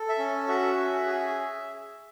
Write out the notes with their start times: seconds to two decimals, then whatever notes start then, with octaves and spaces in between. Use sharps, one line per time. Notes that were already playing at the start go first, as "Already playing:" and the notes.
Already playing: A4
0.09 E5
0.18 C#4
0.48 F#4 E5
0.77 C#4
1.07 G#4